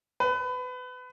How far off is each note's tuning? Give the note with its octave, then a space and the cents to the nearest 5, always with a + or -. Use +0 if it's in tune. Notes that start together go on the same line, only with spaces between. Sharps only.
B4 +25